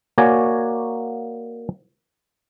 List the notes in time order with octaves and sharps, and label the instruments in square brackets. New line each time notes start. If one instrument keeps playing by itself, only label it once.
[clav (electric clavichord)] A#3 F#4 C#5 D5 G#5 A#5